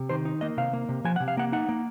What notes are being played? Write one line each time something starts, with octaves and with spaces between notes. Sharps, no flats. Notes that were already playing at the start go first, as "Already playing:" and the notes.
Already playing: C3
D#3 C5
D#4
A#3 D#5
C3 F5
A#3
C3
F3 G#5
C3 F#5
F5
A#3 F#5
D#4 F#5
A#3